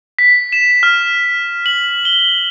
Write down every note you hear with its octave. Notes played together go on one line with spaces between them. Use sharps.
B6
E7
F6
F#7
G7